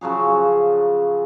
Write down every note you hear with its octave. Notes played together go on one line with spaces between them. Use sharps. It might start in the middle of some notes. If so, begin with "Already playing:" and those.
C#3 F3 F#3 G#4